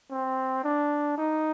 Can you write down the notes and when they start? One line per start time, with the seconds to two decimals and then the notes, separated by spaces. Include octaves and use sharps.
0.11 C4
0.64 D4
1.18 D#4